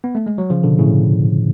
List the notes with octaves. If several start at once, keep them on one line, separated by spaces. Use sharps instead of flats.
B3
A3
G#3
F#3
C#3 F3
B2 D3
A2 C#3